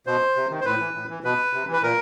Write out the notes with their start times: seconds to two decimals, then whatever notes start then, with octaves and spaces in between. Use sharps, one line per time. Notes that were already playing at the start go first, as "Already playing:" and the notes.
0.07 B2 C5
0.36 C3
0.50 D#3
0.61 C5
0.65 A2 B4
0.80 E3
0.94 A2
1.09 E3
1.24 B2 B4
1.53 C3
1.67 E3
1.73 B4
1.83 A#2 A#4